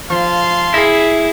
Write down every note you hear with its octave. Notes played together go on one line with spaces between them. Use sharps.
F3 F5 A5 C6
E4 G#4 A#6 C7